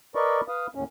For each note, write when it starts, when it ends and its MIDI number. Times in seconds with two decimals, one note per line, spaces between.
0.15 0.41 70
0.15 0.41 71
0.15 0.41 74
0.15 0.41 75
0.15 0.41 83
0.15 0.41 85
0.48 0.67 71
0.48 0.67 77
0.48 0.67 87
0.75 0.84 39
0.75 0.84 45
0.75 0.84 61